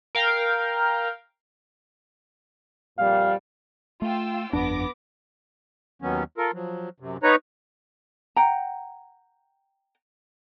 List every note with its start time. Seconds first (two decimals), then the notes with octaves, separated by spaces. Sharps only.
0.15 A#4 F5 G5
2.98 F2 A#2 G3 F5
4.02 A3 F4 G5 E6
4.53 G1 F2 B3 D4 D6 A#6
6.02 D#2 D#3 F#3 B3 C#4
6.38 F4 A4 A#4
6.54 F3 F#3
7.00 F#2 C3
7.23 B3 D#4 B4 C#5 A#5
8.36 F#5 G5 A#5